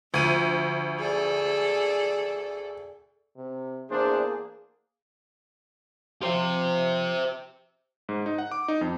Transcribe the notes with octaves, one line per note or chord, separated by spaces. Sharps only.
D2 F3 D#7
G#4 A4 D5
C3
E2 A#3 D4 G#4 C5
F3 F4 G4 C5
G#2
D#4
F#5
D6
D#4
F2